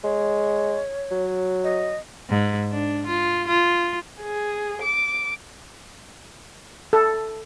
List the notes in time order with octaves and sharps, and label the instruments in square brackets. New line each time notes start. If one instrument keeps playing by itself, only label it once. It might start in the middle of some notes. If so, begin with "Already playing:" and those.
[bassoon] G#3 [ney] C#5
[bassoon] F#3
[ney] D#5
[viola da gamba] G#2
D4
F4
F4
[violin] G#4
D6
[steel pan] A4